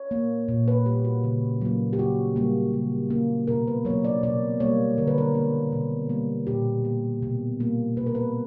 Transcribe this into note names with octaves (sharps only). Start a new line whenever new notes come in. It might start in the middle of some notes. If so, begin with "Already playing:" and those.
Already playing: C#5
A#3
A#2
B4
G3 A#3 G4
F#4
C#3
F#3 A#3
G4
C#3 F#4
G3 A#3
C#3
G3 A#3
B2 A#4
B4
F#3 A#3 C#5
D5
B2 D5
G3 A#3 C#5
D3 A#4
B4
A#4
A#3
B2
G3 A#3
A#2 G4
A#3
B2
G3 A#3
B2 B4
A#4
B4